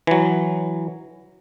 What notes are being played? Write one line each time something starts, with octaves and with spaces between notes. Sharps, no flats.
E3 F#3